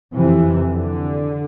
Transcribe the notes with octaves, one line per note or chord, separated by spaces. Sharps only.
F2 C3 E3
D3